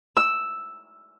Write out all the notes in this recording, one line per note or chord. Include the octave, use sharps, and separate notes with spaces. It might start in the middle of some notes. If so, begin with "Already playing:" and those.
E6